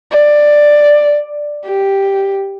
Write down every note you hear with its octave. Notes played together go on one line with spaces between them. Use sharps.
D5
G4